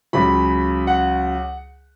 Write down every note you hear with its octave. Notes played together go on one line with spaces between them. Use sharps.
C#2 C#3 F#3 B5
F#5